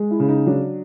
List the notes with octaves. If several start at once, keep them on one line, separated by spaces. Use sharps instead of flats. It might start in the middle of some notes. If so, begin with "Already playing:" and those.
Already playing: G#3
E4
C#3
D#4
F#3 D4